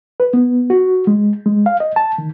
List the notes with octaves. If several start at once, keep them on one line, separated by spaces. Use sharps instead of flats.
B4
B3
F#4
G#3
G#3
F5
D#5
A5
D#3